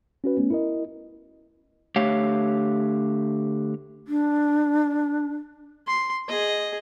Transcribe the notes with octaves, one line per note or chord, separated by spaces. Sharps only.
C#4 F#4 B4
A3 B3 C#4
E4 A#4 D#5
D3 A3 G4 C#5 F5
D4
C6
G#4 D#5